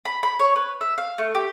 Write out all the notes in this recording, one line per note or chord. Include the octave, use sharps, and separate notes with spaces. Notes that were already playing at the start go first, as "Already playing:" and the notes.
B5
B5
C#5
B4
E5
F5
A3
G4